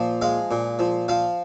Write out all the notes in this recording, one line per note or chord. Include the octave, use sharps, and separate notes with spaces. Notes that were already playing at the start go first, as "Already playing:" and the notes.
Already playing: A#2 F3
G#3 F5
A#2
F3
F3 F5